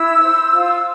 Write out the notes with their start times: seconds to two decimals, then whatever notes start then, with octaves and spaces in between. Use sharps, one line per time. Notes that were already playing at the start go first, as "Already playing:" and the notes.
Already playing: E4 E6
0.21 C5
0.52 F4
0.75 E6